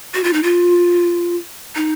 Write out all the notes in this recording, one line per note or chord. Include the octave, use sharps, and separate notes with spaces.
F#4
F4
D#4
F4
D#4